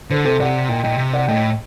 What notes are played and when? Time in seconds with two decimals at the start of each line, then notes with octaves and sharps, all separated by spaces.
0.10 D3 A4 C5
0.24 C3 A4 C5
0.40 C3 D5 F#5
0.69 A#2 D#5 G5
0.83 A#2 D#5 G5
0.98 C3
1.13 D5 F#5
1.28 A2 D#5 G5